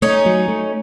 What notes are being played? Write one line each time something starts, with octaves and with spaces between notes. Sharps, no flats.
A3 C#4 D#4
F#3
A3